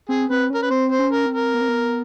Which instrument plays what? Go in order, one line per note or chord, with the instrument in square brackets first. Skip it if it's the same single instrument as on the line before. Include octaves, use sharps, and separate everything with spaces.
[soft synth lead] C4 [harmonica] G#4
[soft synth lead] C4 [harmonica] B4
[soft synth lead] C#4 [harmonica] A#4
[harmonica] B4
[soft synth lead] C4 [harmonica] C5
[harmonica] C5
[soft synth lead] C#4
[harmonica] A#4
[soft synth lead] C4
[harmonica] A#4
[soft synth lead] B3
C4
B3